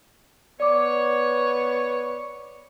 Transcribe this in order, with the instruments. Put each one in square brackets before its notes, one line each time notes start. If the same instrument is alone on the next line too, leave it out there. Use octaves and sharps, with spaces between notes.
[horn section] B3 C#5 [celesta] D5 D6